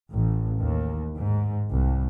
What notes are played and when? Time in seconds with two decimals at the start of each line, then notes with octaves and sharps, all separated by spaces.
0.12 A1
0.59 D#2
1.18 G#2
1.69 C2